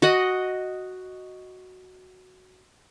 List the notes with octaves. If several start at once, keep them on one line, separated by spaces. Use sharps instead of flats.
F#4 D#5 F#5